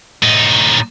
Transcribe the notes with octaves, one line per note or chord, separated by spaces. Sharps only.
A2 D#4